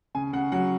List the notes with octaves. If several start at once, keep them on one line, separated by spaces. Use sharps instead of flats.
C#3 G#5
C#3 F#5
F#3 F#5